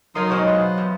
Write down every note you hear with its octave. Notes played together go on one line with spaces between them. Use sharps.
F3 F#3 D#4 A#4 C#5 C6 D#6
B2 G#3 D#4 A#4 C5 C#5
F4 B4 C5
E2